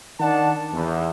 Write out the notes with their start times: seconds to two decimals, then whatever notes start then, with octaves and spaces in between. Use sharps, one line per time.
0.20 D#3 D4 D5 F#5 A5
0.72 E2